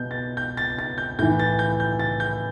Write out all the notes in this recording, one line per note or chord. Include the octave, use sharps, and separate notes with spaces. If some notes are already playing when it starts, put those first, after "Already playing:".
Already playing: B2 G6
A6
G6
A6
A6
G6
A2 E3 G6
A6
G6
G6
A6
G6